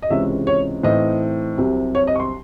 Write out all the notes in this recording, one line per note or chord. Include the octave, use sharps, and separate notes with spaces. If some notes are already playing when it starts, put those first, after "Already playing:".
D#5
C#2 C3 E3 G#3 C#4 E5
C#5
A2 E3 C4 D#4 D#5
C2 C3 F#3
C#5
D#5
C#6
C6